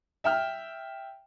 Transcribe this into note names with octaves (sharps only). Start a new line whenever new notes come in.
E5 G5 F6